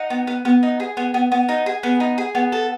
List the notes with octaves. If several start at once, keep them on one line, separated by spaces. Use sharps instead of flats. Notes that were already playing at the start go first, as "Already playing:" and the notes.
Already playing: D#4 F#5
B3
B3
B3
D#4
G#4
B3
B3
B3
D#4
G#4
B3
D#4
G#4
B3
A4